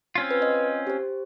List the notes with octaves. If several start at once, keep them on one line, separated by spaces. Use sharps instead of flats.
C4 C#4 F4
B4
D#5
G4 C5